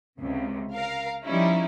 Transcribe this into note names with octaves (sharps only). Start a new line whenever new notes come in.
C#2 C3
A#4 F5 A#5
F3 G3 C#4 D#4 E4